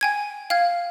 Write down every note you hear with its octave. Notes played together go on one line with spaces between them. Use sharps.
G5 G#5 G#6
F5 G5 F6 G#6